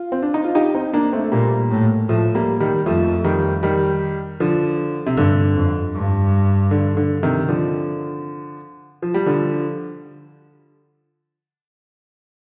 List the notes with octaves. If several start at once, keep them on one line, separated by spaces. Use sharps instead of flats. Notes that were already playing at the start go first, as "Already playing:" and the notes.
Already playing: F4
C4
D4
D#4
F4
D#4 G4
C4 D#4
A#3 D4
A3 C4
A3
A#2 G3 A#3
A2
A2 F3 A3
G3 A#3
D#3 G3
F2 F3 A3
D#3 G3
D#3 G3
D3 F3
C3
G2 D3
F2
G2
D3
D3
C3 D#3
D3 F3
F3
G3
D3 F3